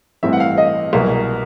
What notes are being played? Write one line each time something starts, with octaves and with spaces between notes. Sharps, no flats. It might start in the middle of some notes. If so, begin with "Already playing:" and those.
A1 G2 E3 A3 C4 E5
F#5
F5
D#5
C2 B2 F#3 A#3